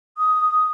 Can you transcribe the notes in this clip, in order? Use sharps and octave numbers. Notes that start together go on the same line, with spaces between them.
D#6